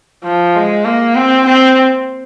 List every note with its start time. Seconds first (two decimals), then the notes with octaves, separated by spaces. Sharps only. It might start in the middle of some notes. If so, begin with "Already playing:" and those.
0.24 F3
0.55 G#3
0.85 A#3
1.16 C4
1.46 C4